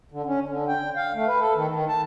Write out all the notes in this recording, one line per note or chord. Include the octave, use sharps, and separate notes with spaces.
D3
C#4
D3
G5
F5
A3
B4
A4
D#3
D#3
A5